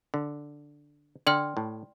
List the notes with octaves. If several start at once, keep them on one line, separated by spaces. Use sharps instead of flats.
D3
D3 D5 G5 C6 F6
A2